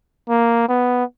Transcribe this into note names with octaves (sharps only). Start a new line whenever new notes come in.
A#3
B3